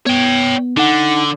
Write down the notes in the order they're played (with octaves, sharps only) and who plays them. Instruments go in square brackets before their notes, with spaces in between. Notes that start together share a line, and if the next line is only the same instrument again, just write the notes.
[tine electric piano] B3 [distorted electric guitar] C#5 G5
[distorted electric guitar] D3 [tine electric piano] D#4 F#5